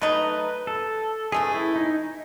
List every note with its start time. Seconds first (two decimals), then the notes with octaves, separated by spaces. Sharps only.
0.01 F#3 A3 D#4 B4
0.67 A4
1.32 E3 A3 C#4 G#4
1.54 E4
1.76 D#4